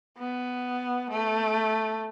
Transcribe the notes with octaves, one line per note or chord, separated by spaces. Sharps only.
B3
A3